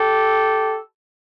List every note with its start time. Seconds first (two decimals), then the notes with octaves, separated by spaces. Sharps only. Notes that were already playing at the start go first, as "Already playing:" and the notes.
Already playing: G4 A4